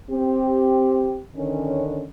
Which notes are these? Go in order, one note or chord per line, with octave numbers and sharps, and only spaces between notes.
C4 G4
D3 D#3 C#4